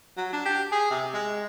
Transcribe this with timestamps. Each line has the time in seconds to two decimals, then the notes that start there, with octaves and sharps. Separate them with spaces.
0.17 F#3
0.33 D4
0.46 G4
0.72 G#4
0.90 C3
1.14 G#3